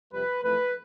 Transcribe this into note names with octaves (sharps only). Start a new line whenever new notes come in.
F2 C3 G3 B4
F2 E3 A3 B4